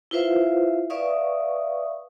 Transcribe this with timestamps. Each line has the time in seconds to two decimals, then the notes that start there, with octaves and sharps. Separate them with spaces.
0.11 E4 F4 B4 C5 E5 F5
0.90 B4 D5 E5 F5 C#6 D#6